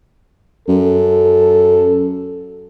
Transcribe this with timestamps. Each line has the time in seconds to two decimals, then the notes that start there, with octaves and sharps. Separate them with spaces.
0.68 F#2 A4